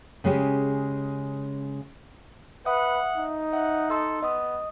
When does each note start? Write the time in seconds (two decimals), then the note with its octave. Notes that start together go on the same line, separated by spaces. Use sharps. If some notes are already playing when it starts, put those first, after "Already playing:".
0.24 C#3 G#3 C#4 G4
2.66 B4 E5 F#5 D#6
3.17 D#4
3.53 E5 F#5
3.90 A4 C6 E6
4.23 B3 D#5 D#6